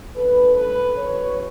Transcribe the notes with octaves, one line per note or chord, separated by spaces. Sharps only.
G2 E3 A3 C#4 A4 B4
A4 B4
E2 C#3 F#3 B4 C#5